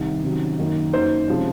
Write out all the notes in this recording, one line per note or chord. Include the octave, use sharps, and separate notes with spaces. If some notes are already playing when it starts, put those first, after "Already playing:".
Already playing: C2 D#3
C3 D#3 F#3 C#4
F#2 D#3 A#3 D#4
F#2 D#3 A#3 D#4 C5
C3 F3 G#3 C#4